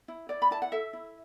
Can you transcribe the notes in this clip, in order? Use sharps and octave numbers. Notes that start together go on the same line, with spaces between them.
E4
E4 D5
B5
E4 A5
F#5
A4 E5
E4